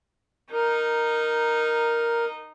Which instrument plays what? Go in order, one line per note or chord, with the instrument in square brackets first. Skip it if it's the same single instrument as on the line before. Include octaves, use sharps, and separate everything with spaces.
[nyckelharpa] D#4 [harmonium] A#4